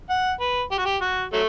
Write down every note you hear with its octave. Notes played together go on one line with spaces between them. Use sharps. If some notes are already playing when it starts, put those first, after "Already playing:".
F#5
B4
G4
F#4
G4
F#4
F#3 A3